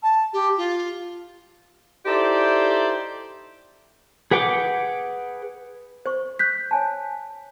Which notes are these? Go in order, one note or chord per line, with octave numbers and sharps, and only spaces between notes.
A5
G4
F4
D#4 E4 G4 A4 C5 D5
G#4 B4 F#5 G5 D6
C5 C#6
F#6 G6 B6
C#5 G#5 A5